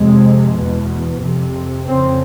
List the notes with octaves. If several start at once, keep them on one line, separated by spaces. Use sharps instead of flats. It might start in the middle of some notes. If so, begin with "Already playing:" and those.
Already playing: F2 C3 G#3
E2 B2
F2 C3
F2 C#3 C4